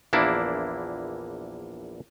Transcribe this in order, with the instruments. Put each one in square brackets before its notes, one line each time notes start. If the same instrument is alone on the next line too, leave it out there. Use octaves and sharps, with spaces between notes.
[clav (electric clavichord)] A#1 E2 A#3 D4 E4